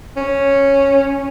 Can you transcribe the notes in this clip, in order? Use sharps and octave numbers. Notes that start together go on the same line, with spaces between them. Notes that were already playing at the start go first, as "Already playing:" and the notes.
C#4